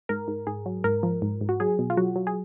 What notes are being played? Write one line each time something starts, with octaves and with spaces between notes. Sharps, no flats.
G#2 A#4
G#2
G#2 G#4
F#3
G#2 A#4
F3
G#2
G#2
F#4
F#3 G#4
B2
F4
F#3 F#4
F#3
G#4